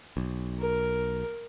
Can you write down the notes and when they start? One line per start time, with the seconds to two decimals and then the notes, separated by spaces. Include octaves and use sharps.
0.17 B1
0.59 A#4